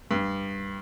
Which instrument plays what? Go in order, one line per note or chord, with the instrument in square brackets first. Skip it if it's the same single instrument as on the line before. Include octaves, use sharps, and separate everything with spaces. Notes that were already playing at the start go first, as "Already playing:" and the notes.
[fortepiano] G2